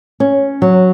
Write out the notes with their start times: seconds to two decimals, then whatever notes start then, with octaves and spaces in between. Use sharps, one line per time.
0.20 C#4
0.62 F#3